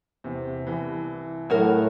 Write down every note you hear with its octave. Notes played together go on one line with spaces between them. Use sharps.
E2 C3
C2 E3
A2 F#3 F#4 A#4